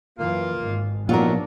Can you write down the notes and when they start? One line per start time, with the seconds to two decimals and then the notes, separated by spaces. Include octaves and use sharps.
0.18 F#2 E3 A#3 F4
0.60 G#1 G#2
1.09 A#2 D#3 F3 F#3 B3 D4 F4 A#4